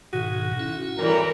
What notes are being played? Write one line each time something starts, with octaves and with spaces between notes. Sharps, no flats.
G#2 B2 D#3 F#4
C#4 E4
A2 E3 G3 A#4